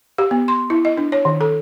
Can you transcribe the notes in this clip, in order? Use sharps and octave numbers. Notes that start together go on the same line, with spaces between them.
G4
B3
C6
E4
D#5
D4
C#5
D#3
A4